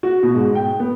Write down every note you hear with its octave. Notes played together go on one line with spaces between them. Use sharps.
F#4
B2
G#2
G5
B3